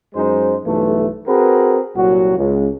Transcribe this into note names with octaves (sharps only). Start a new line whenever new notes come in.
F#2 G#3 D#4 C5
B1 G2 E3 A3
C4 F#4 G#4 A#4 B4
C2 A#2 F#3 F#4
C#2